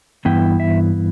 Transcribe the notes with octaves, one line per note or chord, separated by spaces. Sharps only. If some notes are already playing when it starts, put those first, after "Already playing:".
G2 E3 B3 E4 G5
E5